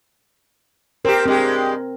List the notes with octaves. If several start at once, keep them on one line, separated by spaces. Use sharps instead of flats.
C4 G4 A#4
G2 G#3 C4 G4